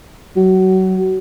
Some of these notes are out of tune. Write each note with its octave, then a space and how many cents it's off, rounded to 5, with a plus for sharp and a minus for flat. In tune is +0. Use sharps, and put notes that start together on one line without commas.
F#3 +25